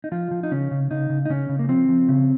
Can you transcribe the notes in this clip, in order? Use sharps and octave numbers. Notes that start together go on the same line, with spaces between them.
D#4
F3 F4
F3
D#4
C#3 C#4
C#3
C#3 D#4
C#3
D#4
C#3 C#4
C#3
A#3
F3 C4
F3
C#3